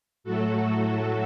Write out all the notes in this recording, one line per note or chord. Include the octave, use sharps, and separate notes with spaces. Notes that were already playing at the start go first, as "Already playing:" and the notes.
A2 F#3 A3 F#4 A4